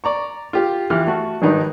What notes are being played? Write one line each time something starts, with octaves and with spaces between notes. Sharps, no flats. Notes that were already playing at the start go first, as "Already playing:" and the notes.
D5 A#5 C#6
F4 G4
E3 F4 G4 F6
A3 F#4
G#1 G2 D#3 D#4 B4